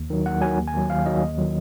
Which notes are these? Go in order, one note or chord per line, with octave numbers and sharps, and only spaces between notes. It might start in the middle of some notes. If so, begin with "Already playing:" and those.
Already playing: D#2
D#3 F#3
D#2 F#5
D#3 F#3 G#5
D#2
G#5
D#3 F#3
D#2 F5
D#3 F#3 D#5
D#2
D#3 F#3